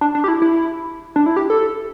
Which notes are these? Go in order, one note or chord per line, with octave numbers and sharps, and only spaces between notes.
D4
D4
G4
E4
E4
D4
E4
G4
A4